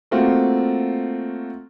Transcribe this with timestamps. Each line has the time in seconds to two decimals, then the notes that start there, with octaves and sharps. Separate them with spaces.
0.11 A3 A#3 C4 F4 F#4